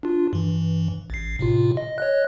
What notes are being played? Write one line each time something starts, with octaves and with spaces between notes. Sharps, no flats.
D4 F4
G2 E3
A1 C7
A2 C3 F4
D#5
C#5 D#5 F#6